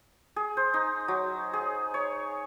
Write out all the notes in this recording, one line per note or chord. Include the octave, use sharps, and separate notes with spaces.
G#4
C5
D#4
F#3
G#4
C#5